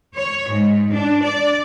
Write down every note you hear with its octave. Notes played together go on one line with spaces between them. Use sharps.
C#5
G#2
D4
D5